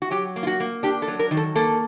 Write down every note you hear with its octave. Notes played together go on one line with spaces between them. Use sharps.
F#4
F#3 G4
A#3
F4
F#4
A#3
D4 G4
A4
F#3
A#4
D#3
A4
A#3 A4